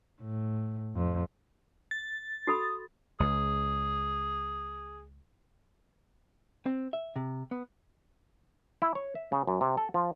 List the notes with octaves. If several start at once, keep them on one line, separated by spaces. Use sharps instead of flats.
A2
F2
A6
F#4 A4 B5 D#6
C#2 G#4
C4
E5
C3
B3
E4
C#5
E5
C#3
F#2
C3
A4
F3